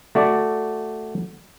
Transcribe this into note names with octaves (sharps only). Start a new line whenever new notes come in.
A3 F#4 D5